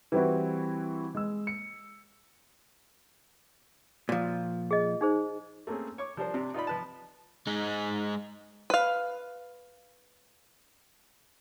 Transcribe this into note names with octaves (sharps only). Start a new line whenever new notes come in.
E3 G3 C4 E4 F#4
G#3 E6
C#7
A#2 F3
G#4 D#5
D#4 G#4 C5
A3 A#3 C4 C#4 G#4
C#5 C#6 D6
F3 G3 D4 A#4 C5
C3 D4
D#4 F4 D5 B5
F3 B4 A5
G#3 D#4
B4 F5